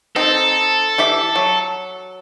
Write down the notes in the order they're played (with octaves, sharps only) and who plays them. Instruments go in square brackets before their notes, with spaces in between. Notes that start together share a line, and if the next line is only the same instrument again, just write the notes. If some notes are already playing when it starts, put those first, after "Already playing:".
[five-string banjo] C4 D#4 [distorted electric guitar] A4
[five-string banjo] E3 G4 E5
F#3